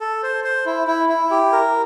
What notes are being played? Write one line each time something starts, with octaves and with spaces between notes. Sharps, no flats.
A4
C5
C5
E4
E4
E4
G4
A#4